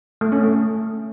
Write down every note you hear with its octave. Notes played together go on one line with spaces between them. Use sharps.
A3
C#4
A3